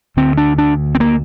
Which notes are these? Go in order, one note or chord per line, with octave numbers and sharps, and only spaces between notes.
D2 D3 C4
D4
D4
C4
A#3